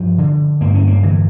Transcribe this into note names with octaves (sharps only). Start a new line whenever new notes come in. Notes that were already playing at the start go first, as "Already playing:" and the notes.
Already playing: G2 F3
D3
G2 A#3
C#4
A#3
D3 E3